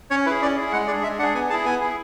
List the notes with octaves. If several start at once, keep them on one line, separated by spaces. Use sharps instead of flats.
C#4 C#5
E4 G#4 B4
C#4 D5
E4 G#4
G#3 F#5
D4 G#4 D5
G#3 E5
D4 G#4 F#5
B3 G#5
E4 G#4 A5
B3 G#5
E4 G#4